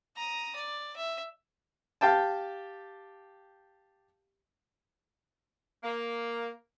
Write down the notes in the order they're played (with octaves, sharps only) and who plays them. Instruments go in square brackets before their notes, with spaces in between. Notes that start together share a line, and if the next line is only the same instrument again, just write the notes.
[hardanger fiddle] A#5 D#6
D5
E5
[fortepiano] G4 F5 G5 A5
[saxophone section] A#3